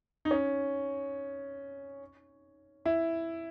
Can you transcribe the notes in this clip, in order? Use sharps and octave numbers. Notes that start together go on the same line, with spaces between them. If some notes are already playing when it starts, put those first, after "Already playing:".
D#4
C#4
E4